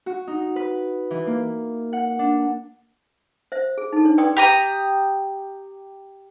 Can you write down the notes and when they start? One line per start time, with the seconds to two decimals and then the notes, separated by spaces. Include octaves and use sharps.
0.06 F#4
0.27 D#4
0.56 B4
1.11 E3
1.27 A#3
1.93 F#5
2.19 D4
3.52 C5 E5
3.78 G#4
3.93 D#4 A4
4.04 D4 C#5
4.18 B4 D5 G5 C6 D6 D#6
4.37 G4 A#5 D#6